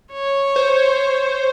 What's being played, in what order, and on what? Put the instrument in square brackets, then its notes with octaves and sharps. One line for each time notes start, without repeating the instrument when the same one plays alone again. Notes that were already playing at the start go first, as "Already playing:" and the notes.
[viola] C#5
[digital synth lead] C5